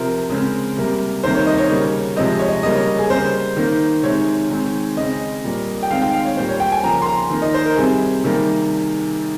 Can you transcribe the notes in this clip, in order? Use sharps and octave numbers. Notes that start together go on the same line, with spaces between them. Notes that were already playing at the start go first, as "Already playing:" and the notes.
Already playing: C3 F3 C4 A#4
C#3 G#3 C4
C3 G3 A#3
C3 D#3 G3 A#3 C5
C#5
D#5
C#5
C#3 G3 A#3
C3 F3 G#3 C4 D#5
C#5
D#5
C#3 G3 A#3 D#5
C#5
G#4
C#3 G3 A#3 C5
D#3 A#3
C3 D#3 G#3 C4 C#5
D#3 G#3 C4
C#3 G#3 C4 D#5
A#2 G3 A#3
G5
D#3 G#3 C4 F5
G5
F5
C#5
A#2 G3 A#3 C5
C#5
G5
G#5
C#3 F3 A#3 A#5
C6
A#5
D#3 A#3
D#5
C5
A#4
C3 G3 C4 G#4
C3 D#3 G3 A#3